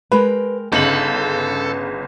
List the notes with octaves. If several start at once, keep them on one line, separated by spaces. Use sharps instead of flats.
G#3 A#4 B4 G5
G1 C#3 B3 D#4 A4 F#7